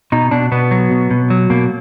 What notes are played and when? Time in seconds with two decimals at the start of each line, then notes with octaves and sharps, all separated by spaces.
0.12 B2 D#4
0.31 B2 D4
0.52 B2 B3
0.71 F#3
0.91 B2
1.11 B2
1.30 F#3
1.50 B2 A#3